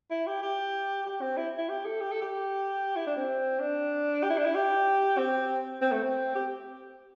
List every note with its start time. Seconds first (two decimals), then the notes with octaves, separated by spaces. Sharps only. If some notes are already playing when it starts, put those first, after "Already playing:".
0.11 E4
0.27 G4
0.42 G4
1.06 G4
1.21 C4
1.37 E4
1.58 E4
1.69 G4
1.85 A4
2.01 G4
2.11 A4
2.22 G4
2.96 E4
3.07 D4
3.17 C4
3.60 D4
4.23 G4
4.30 E4
4.38 D4
4.45 E4
4.55 G4
5.18 C4
5.81 C4
5.92 A3
6.03 C4
6.35 G4